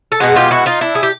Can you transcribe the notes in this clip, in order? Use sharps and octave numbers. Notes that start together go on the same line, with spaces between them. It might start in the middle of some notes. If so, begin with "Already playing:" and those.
A4
B2 G#3 F#4 G#4
F4 G4
E4 F#4
D#4 F4
D4 E4
G#4
G4